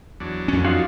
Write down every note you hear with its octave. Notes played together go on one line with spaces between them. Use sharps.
E2 F#3 D4
F2 C#4
D#4 F4 F#4